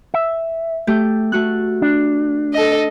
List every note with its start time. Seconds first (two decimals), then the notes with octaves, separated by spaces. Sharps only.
0.14 E5
0.87 A3 G4 G6
1.32 A3 F#4 F#6
1.82 D4
2.53 A4 D#5